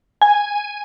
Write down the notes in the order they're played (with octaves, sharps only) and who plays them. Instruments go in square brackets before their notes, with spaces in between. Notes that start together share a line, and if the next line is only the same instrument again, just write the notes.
[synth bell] G#5